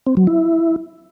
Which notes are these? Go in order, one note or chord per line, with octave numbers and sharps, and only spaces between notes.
C4
F#3
E4